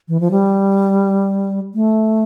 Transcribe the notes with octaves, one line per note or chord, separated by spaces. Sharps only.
E3
F3
G3
A3